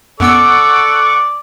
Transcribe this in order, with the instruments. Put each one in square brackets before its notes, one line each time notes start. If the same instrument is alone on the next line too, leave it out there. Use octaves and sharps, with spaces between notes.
[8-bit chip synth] F#2 B3 E6 [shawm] A4 [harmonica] D5 [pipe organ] F#5 C#6 D6